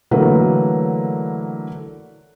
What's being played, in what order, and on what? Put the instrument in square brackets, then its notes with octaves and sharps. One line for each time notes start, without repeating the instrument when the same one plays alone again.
[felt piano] D3 E3 F#3 A3 A#3 B4